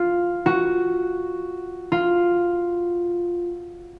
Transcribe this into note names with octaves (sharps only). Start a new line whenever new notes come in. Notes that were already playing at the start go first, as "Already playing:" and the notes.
Already playing: F4
F#4
F4